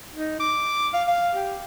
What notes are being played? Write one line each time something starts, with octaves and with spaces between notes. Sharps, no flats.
D#4
D6
F5
F5
G4